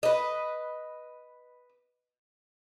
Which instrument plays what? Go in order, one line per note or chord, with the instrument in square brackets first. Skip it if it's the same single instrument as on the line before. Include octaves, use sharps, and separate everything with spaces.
[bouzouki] B4 D#5